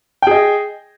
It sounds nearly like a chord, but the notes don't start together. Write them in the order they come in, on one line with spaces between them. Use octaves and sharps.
G5 G#4 D#5